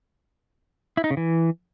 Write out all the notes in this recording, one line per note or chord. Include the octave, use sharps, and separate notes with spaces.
E4
D#4
C#3
E3